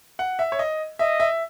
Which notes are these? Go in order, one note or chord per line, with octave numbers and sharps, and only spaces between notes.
F#5
E5
C#5
D#5
D#5 E5
E5